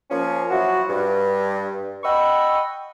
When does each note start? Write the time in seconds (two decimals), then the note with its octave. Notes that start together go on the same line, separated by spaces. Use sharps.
0.10 F3 A#3 C#4
0.50 F3 F#3 E4 F#4
0.89 G2
2.04 D#5 F#5 G5 B5 C#6 E6